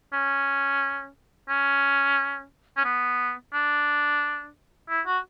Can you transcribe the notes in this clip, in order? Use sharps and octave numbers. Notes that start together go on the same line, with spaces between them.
C#4
C#4
C#4
B3
D4
E4
F#4